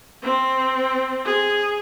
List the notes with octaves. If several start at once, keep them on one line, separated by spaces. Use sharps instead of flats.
C4
G#4